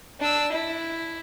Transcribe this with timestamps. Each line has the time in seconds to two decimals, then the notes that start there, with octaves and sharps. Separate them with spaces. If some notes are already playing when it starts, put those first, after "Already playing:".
0.20 D4 E6
0.52 E4